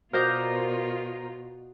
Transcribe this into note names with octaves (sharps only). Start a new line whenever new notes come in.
B2 F4 F#4 A#4 C5 D5 D#5 A#5